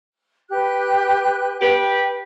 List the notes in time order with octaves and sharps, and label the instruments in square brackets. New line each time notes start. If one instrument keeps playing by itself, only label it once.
[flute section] G4 B4 F#6
[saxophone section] G4 B4 [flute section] G5